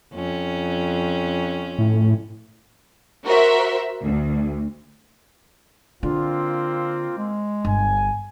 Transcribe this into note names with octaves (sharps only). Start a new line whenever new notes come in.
F2 C#4
A2
F#4 A#4 C5 E5
D2
D3 A#3 C4 F4
G#3
G1 G#5